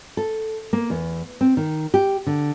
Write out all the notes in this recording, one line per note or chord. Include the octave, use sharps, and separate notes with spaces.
A4
A#3
E2
C4
D#3
G4
D3